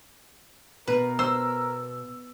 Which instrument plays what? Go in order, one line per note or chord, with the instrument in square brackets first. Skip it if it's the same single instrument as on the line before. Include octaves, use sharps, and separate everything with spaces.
[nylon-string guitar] B2 [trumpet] A#4 [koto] B4
[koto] C5 [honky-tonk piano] E6